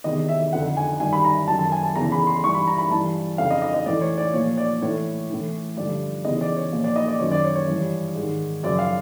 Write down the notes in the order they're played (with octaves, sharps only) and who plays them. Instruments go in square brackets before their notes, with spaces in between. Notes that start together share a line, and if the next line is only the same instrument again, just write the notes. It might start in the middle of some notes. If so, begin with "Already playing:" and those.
[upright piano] E2 C3 D#3 D#5
E5
F2 D3 F3 F#5
G#5
G2 D#3 G#5
B5
A#5
F#2 D#3 A5
A5
G#5
A5
E2 C#3 E3 A#5
B5
C6
G2 E3 C#6
B5
A#5
B5
G2 E3 A5
F2 C#3 F3 F5
D#5
D#5
D#5
A2 E3 D5
C#5
D5
A#2 F3 C#5
D5
A2 E3 C#5
A2 E3
G2 D3 F3 D5
E2 C#3 E3 D#5
D5
C#5
A#2 F3
D5
D#5
D5
F#2 D#3 C#5
D5
C#5
C#5
G2 E3
G#2
D#3
F#2 C#3 F3 D5
F5